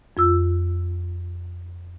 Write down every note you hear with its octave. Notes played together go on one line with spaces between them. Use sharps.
F2 F4 E6